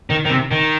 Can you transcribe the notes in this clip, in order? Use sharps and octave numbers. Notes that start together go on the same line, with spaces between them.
D#3
D#3
C3
D#3